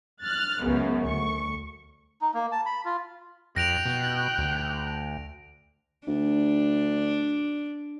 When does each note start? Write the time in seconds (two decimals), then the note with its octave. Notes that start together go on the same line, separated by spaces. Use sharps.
0.22 F6 F#6 A6
0.62 C#2 F#2 C#3 B3
1.06 D2 C#6
2.21 D#4
2.34 A#3
2.52 A5
2.66 B5
2.85 F4
3.56 F2 G5 F#6 A#6 D7 F7
3.86 B2
4.38 D2
6.07 D2 D4